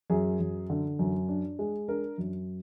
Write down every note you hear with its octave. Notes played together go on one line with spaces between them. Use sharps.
F#2 G#4
F#2
D3
F#2
D4
G#3
D4 A#4
F#2